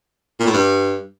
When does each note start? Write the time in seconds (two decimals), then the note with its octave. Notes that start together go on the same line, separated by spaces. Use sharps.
0.40 A#2
0.47 A2
0.54 G2